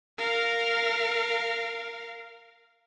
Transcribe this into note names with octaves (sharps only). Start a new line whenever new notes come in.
A#4 F5